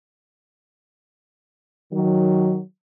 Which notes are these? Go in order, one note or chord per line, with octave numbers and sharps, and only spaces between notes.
D#3 F#3